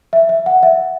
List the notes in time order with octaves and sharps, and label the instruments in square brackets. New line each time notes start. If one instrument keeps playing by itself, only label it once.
[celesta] E5
E5
F#5
E5